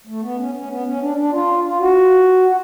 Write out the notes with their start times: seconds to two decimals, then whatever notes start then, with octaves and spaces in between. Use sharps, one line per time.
0.07 A3
0.23 B3
0.38 C#4
0.55 C#4
0.69 B3
0.85 C#4
1.01 D4
1.17 D4
1.32 F4
1.64 F4
1.80 F#4
2.49 F#4